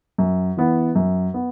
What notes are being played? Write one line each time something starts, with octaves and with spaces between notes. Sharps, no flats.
F#2
E3 B3
F#2
B3